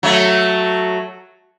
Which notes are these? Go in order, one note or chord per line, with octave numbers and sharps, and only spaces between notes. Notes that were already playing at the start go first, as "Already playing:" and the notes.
F#3 A3